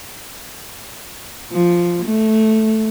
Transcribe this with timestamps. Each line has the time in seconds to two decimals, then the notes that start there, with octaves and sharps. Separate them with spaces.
1.52 F3
2.05 A3